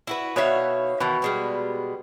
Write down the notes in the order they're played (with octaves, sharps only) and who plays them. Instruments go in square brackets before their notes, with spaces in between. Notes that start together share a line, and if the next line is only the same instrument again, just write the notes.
[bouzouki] E4 F#4 B4
[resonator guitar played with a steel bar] B2 E5 [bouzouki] D#4 C#5 F5
[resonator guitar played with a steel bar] B2 [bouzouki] D#3 E3
[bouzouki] G3 G#3 B3